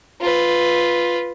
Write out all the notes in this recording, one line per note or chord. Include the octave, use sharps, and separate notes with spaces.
F4 B4